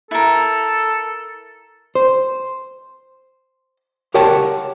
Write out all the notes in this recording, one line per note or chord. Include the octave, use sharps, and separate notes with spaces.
E4 A4 A#4
C5
G4 A#4 C#5 F#5 G5 A5